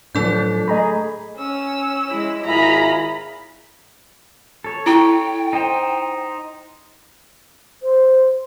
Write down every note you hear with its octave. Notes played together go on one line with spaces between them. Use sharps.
A2 D3 F3 F#3 D4 A4 G6
A3 G#4 D#5 A#5 B5
C#4 E6
G#3 E4
G#1 E4 F4 G#4 A#5 B5
A4 C#5
E4 G5 C#6
D#4 C5
C5